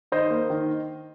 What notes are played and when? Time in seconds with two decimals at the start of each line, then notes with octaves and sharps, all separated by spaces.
0.12 D#3 C5 D#5
0.30 A#3
0.50 D#3